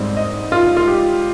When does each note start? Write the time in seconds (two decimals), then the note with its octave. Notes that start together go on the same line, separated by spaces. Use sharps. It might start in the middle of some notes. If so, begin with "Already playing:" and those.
Already playing: G#2 G3 C4
0.17 D#5
0.52 F4
0.77 F4
0.87 G4